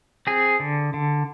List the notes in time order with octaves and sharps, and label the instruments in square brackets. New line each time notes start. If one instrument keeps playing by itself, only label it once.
[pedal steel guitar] C4 G#4
D3
D3